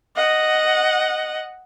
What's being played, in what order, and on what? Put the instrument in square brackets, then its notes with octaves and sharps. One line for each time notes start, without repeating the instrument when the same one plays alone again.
[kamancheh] D#5 F#5